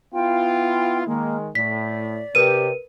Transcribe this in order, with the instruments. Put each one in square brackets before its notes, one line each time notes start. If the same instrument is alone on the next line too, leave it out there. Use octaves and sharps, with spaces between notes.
[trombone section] B3 E4 F4 [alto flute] G5
[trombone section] D#3 G#3 [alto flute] A#3
[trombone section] A2 [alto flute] D5 [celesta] B6
[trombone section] C3 G4 [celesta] A#4 B4 D#7